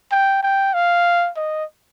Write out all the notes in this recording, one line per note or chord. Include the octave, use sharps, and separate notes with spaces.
G5
G5
F5
D#5